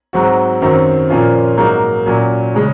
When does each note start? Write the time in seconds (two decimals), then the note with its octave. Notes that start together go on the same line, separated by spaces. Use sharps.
0.13 G#2 F#3 C4 F#4
0.62 F#2 D#3 F#3 C4
1.10 A#2 F3 A#3 C#4 F4
1.57 G#2 F#3 A#3 D#4
2.06 A#2 F#3 C#4
2.54 C#3 G#3 C#4